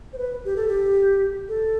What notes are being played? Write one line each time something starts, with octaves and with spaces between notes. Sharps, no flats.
C5
B4
G4
A4
G4
A4